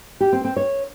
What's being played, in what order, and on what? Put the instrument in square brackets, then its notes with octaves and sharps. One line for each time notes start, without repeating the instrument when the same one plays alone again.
[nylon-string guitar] G4
C4
C4
C#5